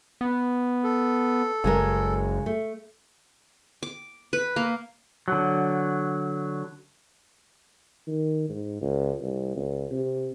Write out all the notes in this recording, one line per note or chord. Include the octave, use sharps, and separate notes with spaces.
B3
A4
F#1 C#3 G#3 A#4
A3
D6
B4
A#3
D3 F#3
D#3
G#2
C#2
C2
C#2
C3